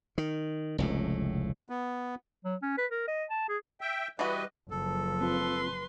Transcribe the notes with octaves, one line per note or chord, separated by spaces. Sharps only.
D#3
F1 C#2 A2
B3
F#3
C#4
B4
A#4
D#5
A5
G#4
E5 G5
E3 G3 F#4 B4 D#5
F#1 F3 A4
C4 F4 B4 C6